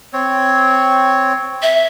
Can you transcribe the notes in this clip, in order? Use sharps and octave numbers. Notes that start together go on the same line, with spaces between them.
C4 C#5
E5